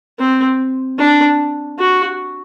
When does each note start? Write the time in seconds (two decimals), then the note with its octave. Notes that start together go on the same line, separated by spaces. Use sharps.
0.19 C4
0.98 D4
1.79 F#4